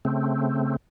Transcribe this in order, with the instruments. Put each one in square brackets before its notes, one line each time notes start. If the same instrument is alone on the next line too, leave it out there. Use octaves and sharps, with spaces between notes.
[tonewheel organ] C#3 A3 C4